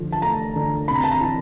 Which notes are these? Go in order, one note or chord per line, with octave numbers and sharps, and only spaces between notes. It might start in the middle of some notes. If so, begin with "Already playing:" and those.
Already playing: D3 F3
A5
A3 A#5
D3
C3 B5
A#5
A5
A#5
E3